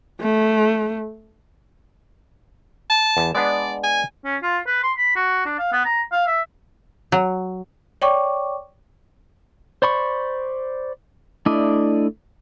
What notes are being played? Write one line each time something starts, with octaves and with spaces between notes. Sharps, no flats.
A3
A5
E2
G#3 B3 D4 D5
G#5
C#4
F4
B4
C6
B5
F#4
D4
F5
B3
A#5
F5
E5
F#3
C#5 D5 G5 C#6 D6
C5 D5 B5 C#6
A3 D4 E4 D5 D#5